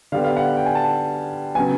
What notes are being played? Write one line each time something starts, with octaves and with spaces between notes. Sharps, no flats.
D3 G3 B3 F5
F5
F#5
G5
G#5
A5
C#3 F#3 B3 G#5